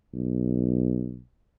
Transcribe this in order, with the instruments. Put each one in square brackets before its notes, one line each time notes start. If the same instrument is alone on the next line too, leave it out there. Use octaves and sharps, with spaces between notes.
[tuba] B1